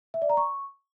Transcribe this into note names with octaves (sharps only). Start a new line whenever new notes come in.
E5
D5
A#5
C#6